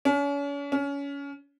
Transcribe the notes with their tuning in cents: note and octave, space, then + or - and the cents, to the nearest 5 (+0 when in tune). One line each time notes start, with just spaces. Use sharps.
C#4 +40
C#4 +25